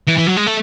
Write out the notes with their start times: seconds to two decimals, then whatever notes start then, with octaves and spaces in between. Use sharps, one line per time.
0.07 E3
0.18 E3
0.27 F#3
0.36 G#3
0.46 A3